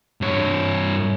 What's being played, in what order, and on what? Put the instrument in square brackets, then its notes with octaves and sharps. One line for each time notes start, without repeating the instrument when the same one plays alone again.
[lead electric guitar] G2 C#5